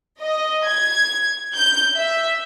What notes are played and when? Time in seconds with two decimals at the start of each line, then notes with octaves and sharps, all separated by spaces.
0.21 D#5
0.67 G#6
1.55 G6
1.98 E5